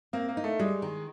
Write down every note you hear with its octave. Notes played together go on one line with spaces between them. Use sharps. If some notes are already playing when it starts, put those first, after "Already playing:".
A#3 C4
A#3
D#4
A3
G3 G#3
D#3